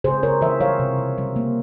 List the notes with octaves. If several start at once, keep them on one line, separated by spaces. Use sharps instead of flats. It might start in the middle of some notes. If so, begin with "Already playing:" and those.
C#3 G#4 C5
C#3 A#4 C#5
E3 C5 E5
G3 C#5 F5
C3
C3
G3
A#3